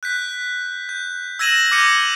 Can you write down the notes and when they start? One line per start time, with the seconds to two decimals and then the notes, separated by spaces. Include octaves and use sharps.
0.03 F#6 G6 B6
0.89 G6
1.39 E6 G#6 A#6 D#7 E7 F#7
1.72 D6 F6 G6 A#6 C#7 D#7